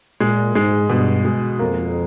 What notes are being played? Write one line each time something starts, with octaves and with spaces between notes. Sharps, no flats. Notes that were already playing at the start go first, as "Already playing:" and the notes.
A#2 G#3
G#2 G#3
G2 B2
G#3
F2 A#3